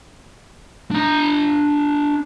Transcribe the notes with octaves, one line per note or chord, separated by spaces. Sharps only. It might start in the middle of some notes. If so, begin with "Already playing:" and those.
D4 A#5